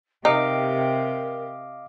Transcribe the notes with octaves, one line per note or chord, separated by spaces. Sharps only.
C3 D#4 G4 A#4 D#5 F5 D6